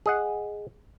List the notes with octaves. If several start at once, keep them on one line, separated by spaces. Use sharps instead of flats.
G#4 D#5 F#5